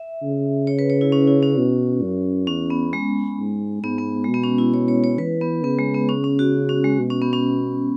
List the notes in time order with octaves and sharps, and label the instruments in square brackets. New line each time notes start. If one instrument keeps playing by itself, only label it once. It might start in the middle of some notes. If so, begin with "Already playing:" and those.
Already playing: [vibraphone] E5
[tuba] C#3
[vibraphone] C#5
B4
C#5
E4
C#4
E4
C#4
[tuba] B2
F#2
[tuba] E2 [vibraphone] C#4
[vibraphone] B3
G#3
[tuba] G#2
[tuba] G#2 [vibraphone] B3
[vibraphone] B3
[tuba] B2 [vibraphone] G#3
[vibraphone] B3
C#4
E4
C#5
C#5
C#5
[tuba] E3 [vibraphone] B4
[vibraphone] B3
[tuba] C#3 [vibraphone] B3
[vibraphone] G#3
B3
C#4
C#4
F#4
C#4
G#3
[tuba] B2
[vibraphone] C#4
B3
C#4